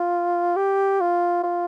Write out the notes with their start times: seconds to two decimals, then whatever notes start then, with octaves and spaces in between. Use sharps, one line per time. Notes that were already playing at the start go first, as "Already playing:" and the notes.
Already playing: F4
0.56 G4
1.01 F4
1.43 F4